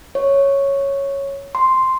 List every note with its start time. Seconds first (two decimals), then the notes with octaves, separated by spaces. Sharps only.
0.15 C#5
1.55 C6